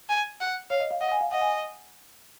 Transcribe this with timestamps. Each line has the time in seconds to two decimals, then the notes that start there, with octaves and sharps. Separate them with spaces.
0.09 G#5
0.40 F#5
0.70 C#5 F5
0.80 D#5
0.91 F5
1.01 D#5 F#5
1.12 G#5
1.21 F5
1.31 D#5 F#5
1.41 G#5